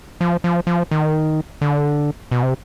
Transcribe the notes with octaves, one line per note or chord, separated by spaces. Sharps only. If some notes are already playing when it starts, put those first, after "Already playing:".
F3
F3
F3
D#3
D3
B2
C3